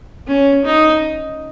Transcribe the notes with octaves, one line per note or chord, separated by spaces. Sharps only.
C#4
D#4